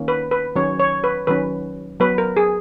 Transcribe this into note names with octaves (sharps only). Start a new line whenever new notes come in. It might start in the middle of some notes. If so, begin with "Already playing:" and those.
Already playing: D#3 A#3 C#4
B4
B4
D#3 F#3 C#4 C#5
C#5
B4
D#3 F#3 C#4 B4
F#3 B3 B4
A#4
G#4